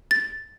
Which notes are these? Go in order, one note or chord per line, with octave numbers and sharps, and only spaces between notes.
A6